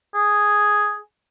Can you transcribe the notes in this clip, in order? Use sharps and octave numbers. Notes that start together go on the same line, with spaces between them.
G#4